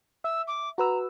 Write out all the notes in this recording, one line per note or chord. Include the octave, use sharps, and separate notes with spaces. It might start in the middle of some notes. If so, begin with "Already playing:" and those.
E5 E6
D6
F#4 B4 A#5 E6